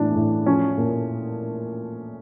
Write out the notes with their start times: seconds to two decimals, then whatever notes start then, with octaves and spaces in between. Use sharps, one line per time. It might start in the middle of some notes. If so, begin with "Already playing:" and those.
Already playing: A2 E3 D4
0.15 A2
0.46 F3 C#4
0.78 A#2